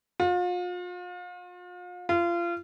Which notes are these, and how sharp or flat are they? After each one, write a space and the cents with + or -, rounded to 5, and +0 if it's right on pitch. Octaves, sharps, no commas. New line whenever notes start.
F4 +40
F4 -25